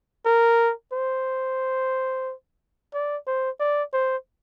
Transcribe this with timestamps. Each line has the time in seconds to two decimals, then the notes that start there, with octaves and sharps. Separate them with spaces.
0.26 A#4
0.93 C5
2.93 D5
3.27 C5
3.60 D5
3.93 C5